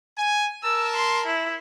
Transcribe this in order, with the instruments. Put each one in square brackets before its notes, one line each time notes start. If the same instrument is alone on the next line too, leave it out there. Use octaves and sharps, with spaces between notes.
[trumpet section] G#5
[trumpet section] A#4 A5 [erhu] E6
[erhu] C6
E4